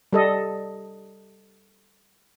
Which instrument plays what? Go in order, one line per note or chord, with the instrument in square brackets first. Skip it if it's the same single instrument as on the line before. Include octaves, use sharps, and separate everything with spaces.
[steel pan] G3 A4 D#5